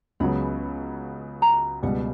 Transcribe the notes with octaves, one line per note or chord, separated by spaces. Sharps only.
C#2 C#3 F#3 B3 B5
A#5
C#2 B2 G3 F#5